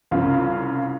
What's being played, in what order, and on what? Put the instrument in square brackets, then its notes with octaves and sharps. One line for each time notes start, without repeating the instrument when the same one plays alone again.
[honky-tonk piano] C2 C#3 F4